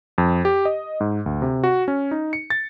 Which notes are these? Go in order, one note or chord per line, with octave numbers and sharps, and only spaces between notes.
F2
G4
D#5
G#2
D2
C3
F#4
C#4
D#4
C#7
A6